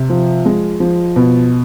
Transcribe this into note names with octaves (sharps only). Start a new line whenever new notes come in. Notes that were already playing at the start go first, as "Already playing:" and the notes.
Already playing: C3
F3
G#3
F3
B2